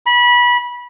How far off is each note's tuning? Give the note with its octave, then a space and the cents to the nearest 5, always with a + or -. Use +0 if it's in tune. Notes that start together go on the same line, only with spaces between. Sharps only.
B5 -25